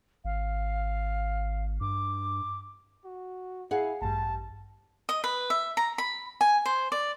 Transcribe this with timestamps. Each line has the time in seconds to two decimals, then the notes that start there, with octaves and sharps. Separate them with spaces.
0.25 G#1 F5
1.81 G2 D6
3.05 F#4
3.71 E4 G#4 F5 F#5
4.02 A1 G2 A5
5.09 D#5
5.24 B4
5.50 E5
5.77 A#5
5.98 B5
6.41 G#5
6.66 C5
6.92 D5